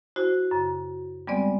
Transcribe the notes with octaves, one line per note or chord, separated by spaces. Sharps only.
E4 F#4 C5
F#2 C#3
G3 G#3 B3 C4 D5